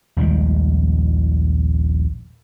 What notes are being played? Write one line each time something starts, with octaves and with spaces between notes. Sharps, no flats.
A#1 D#2 G3 G#3